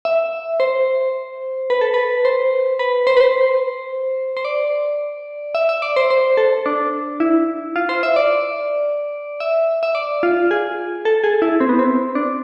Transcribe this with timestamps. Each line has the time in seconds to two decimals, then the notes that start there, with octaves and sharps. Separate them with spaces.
0.05 E5
0.60 C5
1.70 B4
1.81 A4
1.94 B4
2.25 C5
2.79 B4
3.07 C5
3.17 B4
3.21 C5
4.37 C5
4.45 D5
5.55 E5
5.69 E5
5.82 D5
5.96 C5
6.10 C5
6.37 A4
6.66 D4
7.20 E4
7.76 F4
7.89 C5
8.03 E5
8.16 D5
9.40 E5
9.83 E5
9.95 D5
10.23 F4
10.51 G#4
11.05 A4
11.24 G#4
11.42 E4
11.60 C4
11.69 B3
11.79 C4
12.15 D4